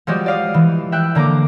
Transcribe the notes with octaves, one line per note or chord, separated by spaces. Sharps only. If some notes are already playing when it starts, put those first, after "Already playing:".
F3 G3 G#3 F#4 G4
D5 F5 D#6
E3
E5 G5 F#6
D3 A#3 A#5 D6